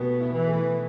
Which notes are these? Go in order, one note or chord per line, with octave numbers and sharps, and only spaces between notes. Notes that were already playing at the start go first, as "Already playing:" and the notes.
Already playing: B2 A3 B3 G4
E4
E3
A3